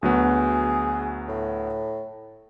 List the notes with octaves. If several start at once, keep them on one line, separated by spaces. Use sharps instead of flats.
D2 F#3 B3 G#4
A2